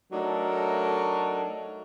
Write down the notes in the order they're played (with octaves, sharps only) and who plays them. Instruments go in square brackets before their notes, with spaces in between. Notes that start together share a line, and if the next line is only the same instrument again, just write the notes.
[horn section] F#3 A3 D4 D#4 A4 A#4